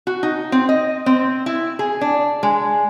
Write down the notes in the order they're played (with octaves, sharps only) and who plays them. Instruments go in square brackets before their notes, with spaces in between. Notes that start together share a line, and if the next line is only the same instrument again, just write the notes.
[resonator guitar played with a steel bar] F#4
D#4
C4
D#5
C4
E4
G#4
D4
G#3